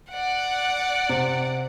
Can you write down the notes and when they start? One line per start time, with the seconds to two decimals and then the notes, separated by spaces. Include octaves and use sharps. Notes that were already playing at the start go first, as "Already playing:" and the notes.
0.10 D5 F#5
1.09 C3